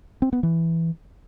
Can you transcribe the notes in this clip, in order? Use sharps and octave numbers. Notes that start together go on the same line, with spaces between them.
C4
B3
E3